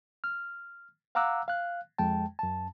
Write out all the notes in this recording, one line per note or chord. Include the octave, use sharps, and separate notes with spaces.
F6
F5 F#5 A#5 D6 E6 F#6
F5 F#6
F2 G#3 G5 A5
F#2 A5